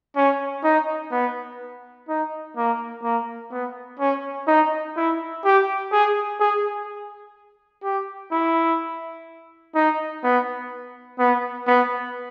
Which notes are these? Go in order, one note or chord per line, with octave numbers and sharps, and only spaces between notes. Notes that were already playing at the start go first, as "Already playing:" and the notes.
C#4
D#4
B3
D#4
A#3
A#3
B3
C#4
D#4
E4
G4
G#4
G#4
G4
E4
D#4
B3
B3
B3